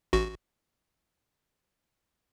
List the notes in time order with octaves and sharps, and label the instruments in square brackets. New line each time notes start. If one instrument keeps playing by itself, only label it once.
[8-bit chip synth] A1 F#4